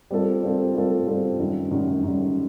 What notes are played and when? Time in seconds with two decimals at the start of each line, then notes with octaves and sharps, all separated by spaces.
0.10 G3 C4 F4 A4
0.43 G3 C4 F4 A4
0.75 G3 C4 F4 A4
1.07 G3 C4 F4 A4
1.38 F#2 D#3 G3
1.71 F#2 D#3 G3
2.03 F#2 D#3 G3